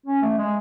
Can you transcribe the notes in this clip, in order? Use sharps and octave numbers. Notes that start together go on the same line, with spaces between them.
C#4
A3
G#3